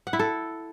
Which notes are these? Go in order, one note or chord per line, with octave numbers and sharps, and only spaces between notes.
F#5
E4
A4